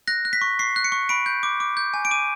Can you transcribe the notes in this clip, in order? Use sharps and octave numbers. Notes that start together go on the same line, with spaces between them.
F#6 A#6
F#6
B6
C#6
C#6 C7
F#6
C#7
C#6
B5 D7
G6
D6
D6
G6
G#5
D7
D6 D#7